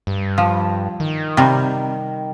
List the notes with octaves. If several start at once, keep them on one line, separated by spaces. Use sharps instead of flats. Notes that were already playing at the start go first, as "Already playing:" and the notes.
G2
F3
D#3
C3 G3